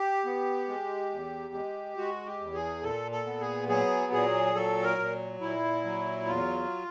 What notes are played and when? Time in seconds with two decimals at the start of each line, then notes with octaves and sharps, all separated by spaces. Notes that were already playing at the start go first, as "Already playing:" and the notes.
Already playing: G4
0.25 B3
0.68 G#3
1.11 E2
1.54 G#3
1.97 G#3 F#4
2.26 G4
2.40 E2
2.54 G#4
2.83 A#2 A4
3.12 A4
3.26 B3
3.41 G#4
3.68 F#3 G#4
4.12 A#2 G#4
4.55 F#3 A4
4.83 A#4
4.99 A#2
5.41 A#2 E4
5.84 F#3
6.27 E2 F4